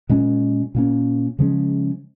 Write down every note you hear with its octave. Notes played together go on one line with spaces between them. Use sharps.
A#2 G#3 C#4
A#2 A#3 C#4
C#3 F3 G#3 C#4